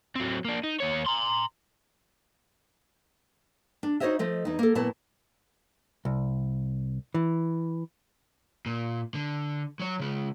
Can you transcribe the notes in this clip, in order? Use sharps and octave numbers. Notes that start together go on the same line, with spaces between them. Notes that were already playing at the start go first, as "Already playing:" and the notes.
F#3 C4
A#3 D4
D#4
D#2 C#5
A#5 C6
D4
D#4 F#4 C5 C#5 D#5 E5
F3 A3 D#5
E2 D#4
A#3 A4
A#2 F#3 B3 E4 A5
C2
E3
A#2
D3
F#3 C#5
C#3 G#3